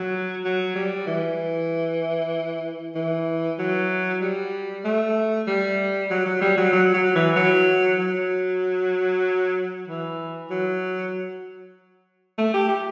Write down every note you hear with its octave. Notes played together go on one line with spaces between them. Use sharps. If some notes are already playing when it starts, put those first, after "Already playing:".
Already playing: F#3
F#3
G3
E3
E3
F#3
G3
A3
G3
F#3
F#3
G3
F#3
F#3
F#3
E3
F#3
F#3
E3
F#3
A3
G4
G4